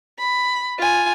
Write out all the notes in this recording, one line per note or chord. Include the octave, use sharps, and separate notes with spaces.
B5
F4 G#5